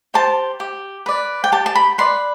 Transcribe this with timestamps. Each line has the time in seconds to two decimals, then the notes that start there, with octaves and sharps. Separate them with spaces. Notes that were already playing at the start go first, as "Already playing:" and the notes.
0.14 G4 C5 A5
0.60 G4
1.06 B4 D5
1.44 G5
1.52 G4 A5
1.66 A5
1.75 B5
1.98 B4 D5 C6